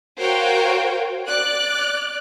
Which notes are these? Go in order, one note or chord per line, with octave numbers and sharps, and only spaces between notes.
F#4 A#4 C5 C#5 F5 G5
D5 F#6